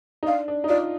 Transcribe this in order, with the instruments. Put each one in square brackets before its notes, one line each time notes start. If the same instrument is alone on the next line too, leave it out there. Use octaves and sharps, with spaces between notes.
[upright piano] D#4
[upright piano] D4 [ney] F5
[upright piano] D4
D#4
[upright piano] F4 [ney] D5